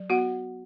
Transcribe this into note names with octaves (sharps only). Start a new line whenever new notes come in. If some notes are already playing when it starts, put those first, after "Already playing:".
Already playing: F#3
B3 F#4 F#5